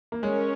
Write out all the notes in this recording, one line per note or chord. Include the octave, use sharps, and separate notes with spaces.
A#3
G#3 C#4 A#4 C#5